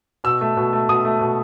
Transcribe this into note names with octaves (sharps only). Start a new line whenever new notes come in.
B2 E6
A3
B2
A3
B2 D#6
A3
B2